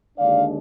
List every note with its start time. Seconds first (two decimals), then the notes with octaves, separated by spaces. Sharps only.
0.18 D#2 D3 G#3 D4 D5 F5